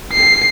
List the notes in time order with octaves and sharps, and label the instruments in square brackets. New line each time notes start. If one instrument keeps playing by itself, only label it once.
[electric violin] C7